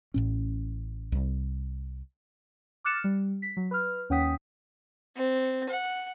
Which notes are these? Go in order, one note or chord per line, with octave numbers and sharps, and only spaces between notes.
A1 A2 C#4
C2
D6 F6 F#6 A6 C#7 E7
G3
B6
F#3
B4 F6
D#2 C#4 F#5 G5 D#6 B6
C4
F#5